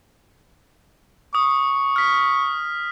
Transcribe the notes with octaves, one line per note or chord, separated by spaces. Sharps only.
C#6 D#6
F6 B6